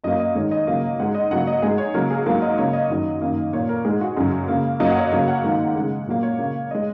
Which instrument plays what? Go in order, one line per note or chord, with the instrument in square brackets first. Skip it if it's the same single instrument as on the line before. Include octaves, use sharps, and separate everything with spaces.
[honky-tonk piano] F#2 F#3 A#3 D#5
D#5
G#2 D#3 G#3 C#5
D#5
C#3 F#3 A#3
G#2 G#3 F#5
D#5
C#3 F#3 A#3 F#5
D#5
G#2 G#3 G#4
C#5
C#3 F#3 A#3 A#4
G#4
G#2 F#3 A#3 A#4
D#5
C#3 A#3 C#5
D#5
F#2 D#3 F#3 D#5
F#2 D#3 A#3
A#2 A#3 C#5
A#4
G#2 G#3 G#4
F#4
F#2 C#3 F#3 G#4
C#3 A#3
F#2 F#3 A#3 D#5
F#5
C#5
D#5
C#3 F#3 A#3 C#5
F#5
G#2 D#3 A#3
C#3 G#3
A#2 F#3 A#3
C#5
C#3 A#3
G#3 D#5